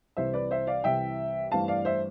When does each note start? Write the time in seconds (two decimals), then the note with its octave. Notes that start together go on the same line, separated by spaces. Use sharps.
0.17 C2 C3 E3 C5 E5
0.34 B4 D5
0.51 C5 E5
0.67 D5 F5
0.84 C2 C3 E3 E5 G5
1.51 G2 E3 A3 C4 F5 A5
1.68 D5 F5
1.85 C5 E5